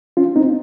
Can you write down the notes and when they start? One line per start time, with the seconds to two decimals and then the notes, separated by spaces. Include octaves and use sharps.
0.17 C#4 F4
0.36 C4 D#4